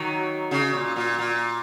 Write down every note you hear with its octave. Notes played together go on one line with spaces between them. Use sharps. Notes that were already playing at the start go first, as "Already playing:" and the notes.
Already playing: D#3 F#3
C#3
A#2
A#2
A#2